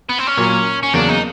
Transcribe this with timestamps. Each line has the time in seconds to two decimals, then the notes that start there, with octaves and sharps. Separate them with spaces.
0.09 B3
0.19 C4
0.27 C#4
0.37 A#2 F#3 A#3
0.83 C#4
0.93 E2 C#3 F#3 A#3 D4
1.09 D#4